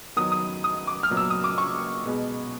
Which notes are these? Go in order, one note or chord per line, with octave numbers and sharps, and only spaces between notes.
D#3 F#3 B3 D#6
D#6
D#6
D6
F6
A#2 F#3 B3
E6
D#6
D6
C#6
B2 G#3 B3